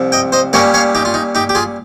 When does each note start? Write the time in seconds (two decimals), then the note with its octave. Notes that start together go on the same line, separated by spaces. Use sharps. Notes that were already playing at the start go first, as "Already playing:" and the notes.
Already playing: C2 C3 F3 C4
0.12 D#5 G5
0.32 C5 D#5
0.53 A#2 G3 C#4 A#4 C#5
0.74 C#5 F5
0.95 D#4 G4
1.05 F4
1.14 D#4
1.35 D#4 G4
1.49 G4
1.55 F4 G#4